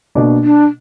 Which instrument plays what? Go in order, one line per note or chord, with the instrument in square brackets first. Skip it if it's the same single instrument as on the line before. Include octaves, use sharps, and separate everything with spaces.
[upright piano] B2 A#3 D4
[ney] D4